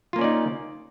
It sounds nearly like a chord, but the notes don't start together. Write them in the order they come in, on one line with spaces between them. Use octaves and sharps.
F4 A#3 C#4 D5 D#4